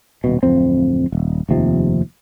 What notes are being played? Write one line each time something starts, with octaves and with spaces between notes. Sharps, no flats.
D#1 B2
D1 F2 C4
D#1
F1 D#2 C3 F3